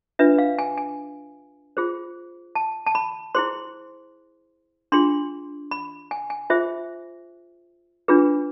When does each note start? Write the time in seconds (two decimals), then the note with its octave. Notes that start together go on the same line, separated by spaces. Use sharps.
0.19 D4 F4 B4 E5
0.38 F5
0.59 G#5
0.78 G#5
1.77 F4 G#4 C5
2.55 A5
2.87 A5
2.95 B5
3.35 E4 G#4 C5 C6
4.92 D4 F4 G#4 C6
5.71 B5
6.11 G#5
6.30 G#5
6.50 F4 G#4 C5 E5
8.08 D4 F4 G#4 B4